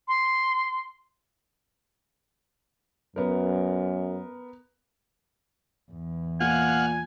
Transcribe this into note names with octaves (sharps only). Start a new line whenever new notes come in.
C6
F#2 B3 A#4
E2
A#2 F5 F#5 G#5